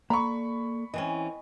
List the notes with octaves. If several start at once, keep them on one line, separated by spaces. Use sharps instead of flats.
A#3 A4 D5 A#5 B5 C#6
E3 C4 C#4 D#5 G#5